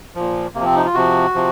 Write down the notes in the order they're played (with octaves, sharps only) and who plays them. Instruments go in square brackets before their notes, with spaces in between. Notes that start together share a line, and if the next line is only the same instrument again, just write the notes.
[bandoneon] A#2 F3
C3 A#3
F3 C4
D#4
F4
C3 F3 F#4
C3 F3